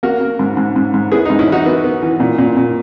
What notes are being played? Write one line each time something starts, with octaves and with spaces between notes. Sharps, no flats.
A#3 F#4 A#4
A#3
G#2
G#2
G#2
G#2
B3 E4 G#4
D#4
G#2
C#4 E4
E3 D#4 F#4
B3
B3
E3
A#2
A#2
A#2